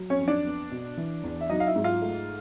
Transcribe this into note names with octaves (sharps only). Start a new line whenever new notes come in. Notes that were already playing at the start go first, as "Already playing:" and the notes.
Already playing: F#3
C#4 C#5
F2
D4 D5
B3
B2
E3
E2
E5
F#3 D#4 D#5
F5
E4 E5
G#2
F4 F5
A3